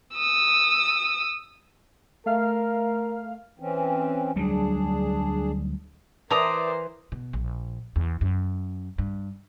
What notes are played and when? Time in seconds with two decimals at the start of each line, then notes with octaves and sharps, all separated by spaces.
0.15 D#6 E6
2.26 A3 A#4 F5 F6
3.60 E3 C4 C#4
4.36 D2 F#3 G3 D4 G#4
6.30 E3 A#4 C5 D5 A#5 D#6
7.12 B2
7.33 A#1
7.96 E2
8.21 F#2
8.99 G2